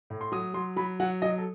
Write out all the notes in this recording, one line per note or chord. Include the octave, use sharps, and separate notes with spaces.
A2
C6
F#3 D#6
F#3 C6
F#3 B5
F#3 F#5
F#3 D#5
A4